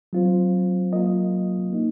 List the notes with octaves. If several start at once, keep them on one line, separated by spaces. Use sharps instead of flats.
F#3 C4 F4 C5
F#3 A#3 F4 A#4 D#5
A#3 D#4